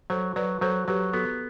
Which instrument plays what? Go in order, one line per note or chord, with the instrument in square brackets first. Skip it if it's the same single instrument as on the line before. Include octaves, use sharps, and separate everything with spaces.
[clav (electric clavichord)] F#3 [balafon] A4 C5
[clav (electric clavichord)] F#3 [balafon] B4 D5
[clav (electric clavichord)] F#3 [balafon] A4 C5
[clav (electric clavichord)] F#3 [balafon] G4 B4
[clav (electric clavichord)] B3 [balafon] F#4 A4